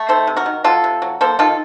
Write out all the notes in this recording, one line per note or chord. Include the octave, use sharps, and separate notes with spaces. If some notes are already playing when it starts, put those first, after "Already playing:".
Already playing: A3
D#3 A4 C5
C3
F#4 A#4
D#3
F#3 F4 A4
C3
F#3
A#3 A4 C5
D#3 F4 A4